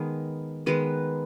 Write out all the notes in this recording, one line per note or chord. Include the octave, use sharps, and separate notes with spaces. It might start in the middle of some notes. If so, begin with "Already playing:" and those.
Already playing: D#3 G#3 B3
D#3 G#3 B3 B4